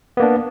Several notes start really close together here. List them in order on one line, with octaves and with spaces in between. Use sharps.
B3 A#3 D4